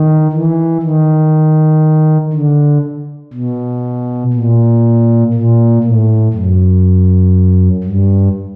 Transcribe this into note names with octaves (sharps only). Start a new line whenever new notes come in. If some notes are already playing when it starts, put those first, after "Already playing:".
Already playing: D#3
E3
D#3
D3
B2
A#2
A#2
A2
F#2
G2